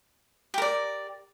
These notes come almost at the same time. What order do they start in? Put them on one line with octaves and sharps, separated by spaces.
G4 A#4 D5